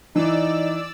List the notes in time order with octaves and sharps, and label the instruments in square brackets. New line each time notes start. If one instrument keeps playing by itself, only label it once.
[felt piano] E3 [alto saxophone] D#4 [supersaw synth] D5 E6